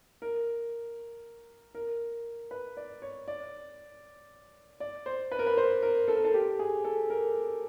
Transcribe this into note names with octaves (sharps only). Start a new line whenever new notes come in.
A#4
A#4
B4
D5
C#5
D5
D5
C5
B4
A#4
B4
C5
A#4
A4
A#4
A4
G4
G#4
A4
A#4